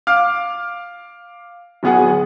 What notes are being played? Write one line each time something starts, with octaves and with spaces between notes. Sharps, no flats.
F5 D6 F6
D1 F#3 B3 G#4 F#5